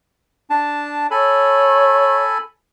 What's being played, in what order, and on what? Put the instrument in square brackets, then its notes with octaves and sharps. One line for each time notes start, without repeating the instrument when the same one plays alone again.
[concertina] D4 A5
[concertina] A4 G#5 B5 [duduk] C#5